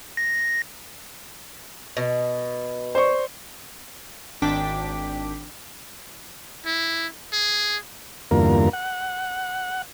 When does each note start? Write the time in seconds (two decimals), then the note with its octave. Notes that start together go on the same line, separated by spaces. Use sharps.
0.17 A#6
1.97 B2
2.95 C5 D5 C#6
4.42 G#1 D4 G5 D6 B6
6.66 E4
7.33 G#4
8.31 E2 G2 D3 A#3 F4 A#4
8.73 F#5